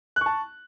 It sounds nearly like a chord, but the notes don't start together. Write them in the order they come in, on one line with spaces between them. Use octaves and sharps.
F#6 C#6 A5